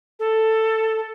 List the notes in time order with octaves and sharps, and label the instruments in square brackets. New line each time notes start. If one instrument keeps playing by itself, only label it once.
[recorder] A4